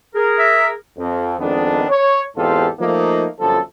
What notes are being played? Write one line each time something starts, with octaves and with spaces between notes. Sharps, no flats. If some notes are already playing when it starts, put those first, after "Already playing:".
G#4 A#4
E5
F2
F2 D#3 G#3 B3 D4
C#5
E2 G#2 C4 F4 G4 A4
F3 A3 A#3 D#4
G1 F#2 F3 A4